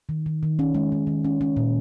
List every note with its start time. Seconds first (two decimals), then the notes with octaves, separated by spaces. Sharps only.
0.09 D#3
0.26 D#3
0.43 D#3
0.59 C#4
0.75 G#3
0.92 D#3
1.07 D#3
1.25 C#4
1.41 C#4
1.57 A#2